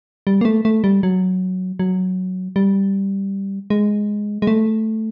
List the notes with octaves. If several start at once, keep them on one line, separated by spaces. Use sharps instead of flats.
G3
A#3
A3
A3
G3
F#3
F#3
G3
G#3
G#3
A3